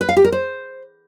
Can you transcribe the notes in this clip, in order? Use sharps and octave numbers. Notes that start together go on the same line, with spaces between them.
B4
F5
G4
A#4
C5